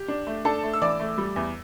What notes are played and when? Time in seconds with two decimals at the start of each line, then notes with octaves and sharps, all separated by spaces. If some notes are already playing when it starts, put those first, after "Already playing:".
Already playing: G4
0.08 D4
0.27 A3
0.45 D4 A4 A5
0.63 A3
0.73 E6
0.82 E3 D5 D6
1.00 A3
1.18 G3
1.36 E2